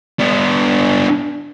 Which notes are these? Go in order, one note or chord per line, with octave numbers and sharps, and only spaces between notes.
B3 D4